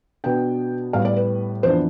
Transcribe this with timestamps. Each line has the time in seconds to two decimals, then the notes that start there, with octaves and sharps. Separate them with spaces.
0.24 B2 B3 D4 G5
0.93 A2 G3 B3 F5
1.05 D5
1.16 B4
1.63 F2 E3 B3 D4 C5